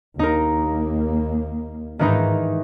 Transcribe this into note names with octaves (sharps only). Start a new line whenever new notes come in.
D#2 A#3 D#4 A#4
G#2 D#3 E3 D#4